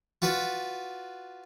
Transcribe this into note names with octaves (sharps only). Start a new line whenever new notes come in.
F4 F#4 B4 D5 B5